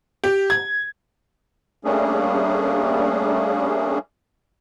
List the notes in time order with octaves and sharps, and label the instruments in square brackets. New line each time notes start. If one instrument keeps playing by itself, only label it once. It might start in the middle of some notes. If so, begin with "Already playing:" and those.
[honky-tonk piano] G4
G#6
[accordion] G3 A3 A#3 C#4 D4 G#4